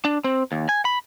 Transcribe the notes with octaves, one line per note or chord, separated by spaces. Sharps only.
D4
C4
D#2
G#5
B5